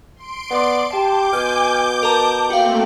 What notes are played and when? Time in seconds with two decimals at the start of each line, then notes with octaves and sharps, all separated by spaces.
0.15 C6 D7
0.50 B3 D5
0.93 G4 A5 D6 G6
1.33 B2 G#5 F6
2.03 A#4 A5 A#5
2.50 A3 A#3 C4 F#4 F5 G5